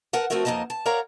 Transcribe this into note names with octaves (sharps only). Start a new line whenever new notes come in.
A#4 B4 F#5 A5
F3 A3 C4 F#4 A#4 E5
F2 A#3 D#4 D#5 A5
A5
A#4 C#5 D5 F5 F#5 A#5